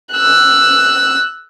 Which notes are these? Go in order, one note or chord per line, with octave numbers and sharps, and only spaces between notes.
E6 F#6